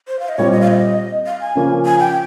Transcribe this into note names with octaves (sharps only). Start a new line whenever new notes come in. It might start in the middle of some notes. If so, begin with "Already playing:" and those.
C5
F5
D#5
A#2 G3 C4 C#5
D#5
F5
D#5
F5
G#5
C#3 F3 A#3 C#4
G#5
G5